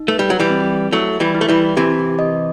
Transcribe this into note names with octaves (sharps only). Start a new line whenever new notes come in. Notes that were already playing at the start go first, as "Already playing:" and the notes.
Already playing: D#4
A3 B4
G3
F#3
E3 G3
C4
F#3 A3 E4
E3 G3
E4
A3
E3 G3
C3 E3 G4
D#5